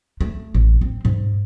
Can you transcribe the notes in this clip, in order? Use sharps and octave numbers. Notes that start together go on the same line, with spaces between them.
A3
A1
C4
G#2